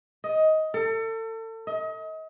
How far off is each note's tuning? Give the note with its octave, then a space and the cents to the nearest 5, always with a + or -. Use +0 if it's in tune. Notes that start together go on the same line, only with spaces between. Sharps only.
D#5 +15
A4 +35
D#5 +35